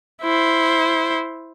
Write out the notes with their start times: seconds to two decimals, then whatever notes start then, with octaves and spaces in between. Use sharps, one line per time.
0.22 E4 C5